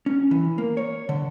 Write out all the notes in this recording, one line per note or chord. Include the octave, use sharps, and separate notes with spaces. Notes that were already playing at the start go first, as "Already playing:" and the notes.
C#4
E3
A#3
C#5
D3